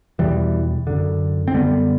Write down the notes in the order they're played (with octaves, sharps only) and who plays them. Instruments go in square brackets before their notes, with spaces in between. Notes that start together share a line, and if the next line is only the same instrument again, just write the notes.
[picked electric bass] E2 B2 E3 G3
F#2 D3
C4
F#2 D3 G3 B3